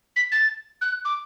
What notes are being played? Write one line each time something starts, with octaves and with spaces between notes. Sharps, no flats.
B6
A6
F#6
D6